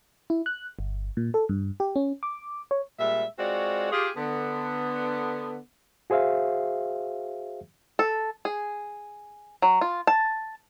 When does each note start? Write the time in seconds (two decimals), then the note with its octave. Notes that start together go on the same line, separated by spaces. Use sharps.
0.30 E4
0.46 F#6
0.79 G1
1.17 A#2
1.34 A4
1.49 G2
1.80 G4
1.96 C#4
2.23 D6
2.71 C#5
2.99 A#2 G3 G#3 E5
3.39 G#3 C4 F4 F#4 C#5 D5
3.92 F4 G4 G#4
4.17 D3 B3
6.10 F#4 G#4 C5 E5 F5
7.99 A4
8.45 G#4
9.62 F#3
9.81 F4
10.07 A5